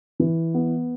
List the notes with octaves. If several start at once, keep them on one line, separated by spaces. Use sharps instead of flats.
E3
B3